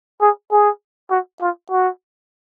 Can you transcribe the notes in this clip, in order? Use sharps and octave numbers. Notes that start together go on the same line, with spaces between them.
G#4
G#4
F#4
F4
F#4